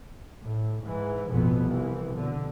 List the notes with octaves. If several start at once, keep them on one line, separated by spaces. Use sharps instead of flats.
A2
G#2 E3
A1 F2 B2 B3
C2 E3
B2 D3